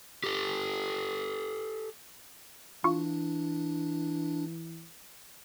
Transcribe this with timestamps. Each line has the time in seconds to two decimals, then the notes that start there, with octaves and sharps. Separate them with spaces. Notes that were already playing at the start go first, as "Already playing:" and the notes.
0.24 G4 A4
2.84 E3 D4 F4 C#6